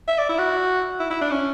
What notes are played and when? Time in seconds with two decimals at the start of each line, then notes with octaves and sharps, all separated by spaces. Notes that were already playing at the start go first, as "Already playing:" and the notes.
0.08 E5
0.18 D5
0.29 E4
0.38 F#4
1.00 E4
1.10 E4
1.21 D4
1.31 C#4